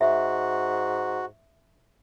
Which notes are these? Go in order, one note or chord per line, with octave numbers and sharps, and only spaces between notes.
G#2 F#4 E5